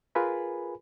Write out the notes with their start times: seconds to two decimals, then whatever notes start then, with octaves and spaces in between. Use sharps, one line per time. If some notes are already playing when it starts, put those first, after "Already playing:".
0.15 F4 G#4 A#4 B4 G#5 B5